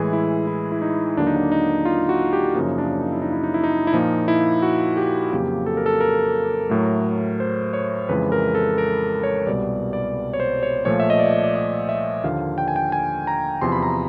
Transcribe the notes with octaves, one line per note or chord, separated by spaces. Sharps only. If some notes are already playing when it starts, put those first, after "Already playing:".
Already playing: A2 E3 G#3 G#4
E4
E4
E4
D#4
D#2 D3 F#3 A#3 D4
D#4
D4
D#4
F4
F#4
G4
F#2 C#3 F3 A#3 D#4
D4
D#4
E4
D#4
E4
D#4
E4
D#4
E4
A#2 F3 A#3 D#4
E4
F#4
G4
F2 C#3 F#3 A#3 G4
A4
A#4
A4
A#4
A2 F#3 A3
C5
C#5
F2 C#3 E3 G#3 B4
A#4
A4
A#4
C#5
C2 B2 G3 D5
D5
C#5
C5
C#5
A#2 F3 A3 C#5
E5
D#5
D5
D5
D#5
E5
D#2 D3 F3 A#3 F5
G5
G#5
G5
G#5
A#5
E2 C3 F3 C6
B5
A#5